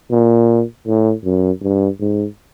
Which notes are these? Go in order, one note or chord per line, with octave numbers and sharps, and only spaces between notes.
A#2
A2
F#2
G2
G#2